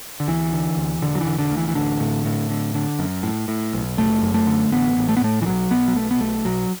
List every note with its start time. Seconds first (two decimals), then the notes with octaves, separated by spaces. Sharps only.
0.20 D3
0.27 D2 E3
0.53 D3
0.77 D2
1.01 E1 D3
1.15 F#3
1.20 E3
1.26 D3
1.39 D3
1.51 D2
1.57 E3
1.68 E3
1.75 A1 D3
2.00 A2
2.25 A2
2.50 D3
2.74 D3
2.99 F#2
3.23 A2
3.48 A2
3.73 B1
3.97 F#1 A3
4.22 F#2
4.34 A3
4.47 D3
4.71 A1 B3
4.97 A1
5.09 A3
5.17 B3
5.21 A2 A3
5.42 E3
5.46 B1 F#3
5.70 B1 B3
5.88 F#3
5.95 B2 A3
6.11 B3
6.20 B1 A3
6.44 B1 F#3